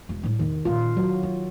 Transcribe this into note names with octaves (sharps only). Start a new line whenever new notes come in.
E1
A2 G3
E2 C3 D#3
A#2 C#4 F4
D2 F#3
F4